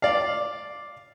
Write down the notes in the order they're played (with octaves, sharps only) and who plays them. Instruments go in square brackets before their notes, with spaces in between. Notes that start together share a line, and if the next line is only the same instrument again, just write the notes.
[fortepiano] D5 F5